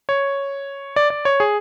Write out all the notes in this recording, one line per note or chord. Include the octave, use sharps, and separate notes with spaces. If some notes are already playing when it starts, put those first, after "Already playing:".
C#5
D5
D5
C#5
G#4